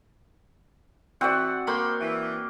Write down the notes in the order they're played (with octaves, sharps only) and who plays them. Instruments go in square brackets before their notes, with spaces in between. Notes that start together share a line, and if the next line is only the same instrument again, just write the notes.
[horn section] A2 E3 [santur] C4 F#4 D5 [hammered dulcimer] F#5
[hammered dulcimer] A#3 G5 [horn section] C#5 B5 C6
[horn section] E3